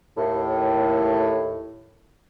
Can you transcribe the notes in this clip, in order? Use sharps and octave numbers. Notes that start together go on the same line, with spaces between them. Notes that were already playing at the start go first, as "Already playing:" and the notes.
D#2 A2